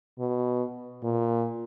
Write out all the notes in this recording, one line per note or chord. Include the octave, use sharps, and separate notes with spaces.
B2
A#2